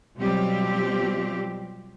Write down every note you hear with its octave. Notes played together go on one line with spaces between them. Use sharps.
B2 F#3 G3 C4 F4 G4